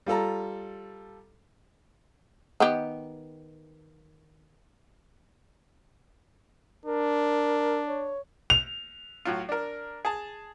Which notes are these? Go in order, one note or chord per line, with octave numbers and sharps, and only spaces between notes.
G3 F4 A4 A#5
D#3 B3 G4
D4 A#4
C#5
F7
A2 F#3 F4
D4 A#4
G#4 A5